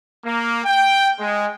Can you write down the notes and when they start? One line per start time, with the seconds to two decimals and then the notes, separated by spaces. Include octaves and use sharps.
0.25 A#3
0.65 G5
1.19 G#3